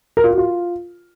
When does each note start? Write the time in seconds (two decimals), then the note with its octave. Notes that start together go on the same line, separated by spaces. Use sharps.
0.17 A#4
0.24 F4
0.31 F#4
0.38 F4